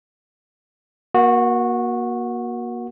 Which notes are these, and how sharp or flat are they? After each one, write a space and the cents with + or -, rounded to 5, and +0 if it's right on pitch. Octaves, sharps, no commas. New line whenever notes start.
A#3 +30 F#4 -15